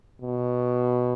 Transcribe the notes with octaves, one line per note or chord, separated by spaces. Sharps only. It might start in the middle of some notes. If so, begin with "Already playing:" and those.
B2